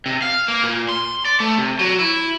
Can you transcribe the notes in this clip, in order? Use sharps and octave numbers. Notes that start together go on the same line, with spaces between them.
C3
F5
A#3
A#2
C6
D5
A3
C3
F#3
E4